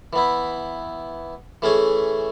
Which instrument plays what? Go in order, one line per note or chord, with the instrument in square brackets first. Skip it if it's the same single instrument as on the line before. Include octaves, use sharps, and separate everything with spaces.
[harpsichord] E3 B3 E4
E3 A3 C#4 G#4